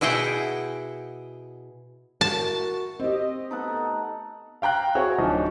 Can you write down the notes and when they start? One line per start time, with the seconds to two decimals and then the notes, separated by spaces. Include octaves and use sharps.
0.01 B2 E4 G#4 F#5 G5
2.21 E4 F#4 A#4 A5
3.00 C4 G4 D#5
3.51 A3 B3 D#4 A4 F#5
4.62 F5 G5 A#5 F#6
4.95 C4 E4 F#4 G#4 C#5
5.18 D1 F3 D4 D#4 D#5